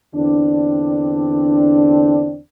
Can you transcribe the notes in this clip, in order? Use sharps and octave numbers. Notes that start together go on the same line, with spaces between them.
E2 D3 C4 D4